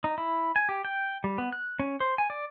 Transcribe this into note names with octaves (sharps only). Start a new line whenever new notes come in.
D#4
E4
G#5
G4
G5
G3
B3
F#6
C#4
C5
G#5
D5